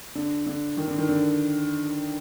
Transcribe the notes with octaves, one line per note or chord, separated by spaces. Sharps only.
D3
D3
D#3
D3
D#3
D3